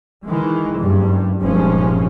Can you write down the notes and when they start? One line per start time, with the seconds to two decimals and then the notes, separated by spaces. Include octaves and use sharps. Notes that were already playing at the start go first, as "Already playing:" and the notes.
0.25 D#3 E3 G#3
0.79 F#1 G2 G3
1.42 F1 G2 A#2 F3 G#3 C#4